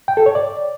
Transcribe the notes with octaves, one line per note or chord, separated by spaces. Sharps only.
G5
A4
C#5
D5